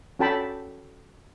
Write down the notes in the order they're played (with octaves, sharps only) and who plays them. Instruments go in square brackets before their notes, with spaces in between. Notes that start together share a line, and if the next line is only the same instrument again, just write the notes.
[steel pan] C#4 F#4 A4 G5 A5 B5